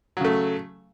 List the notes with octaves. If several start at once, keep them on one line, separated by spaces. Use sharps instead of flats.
C#3 F#3 A3